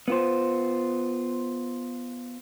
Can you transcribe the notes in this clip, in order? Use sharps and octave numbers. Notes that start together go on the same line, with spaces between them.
B3 F4 C5